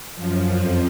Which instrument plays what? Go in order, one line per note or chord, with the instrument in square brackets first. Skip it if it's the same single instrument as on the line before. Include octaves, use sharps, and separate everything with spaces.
[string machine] F#2 F3
F2 F3